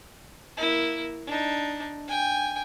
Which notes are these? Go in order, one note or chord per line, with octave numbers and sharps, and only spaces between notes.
A#3 E4
D4 D#4
G5 G#5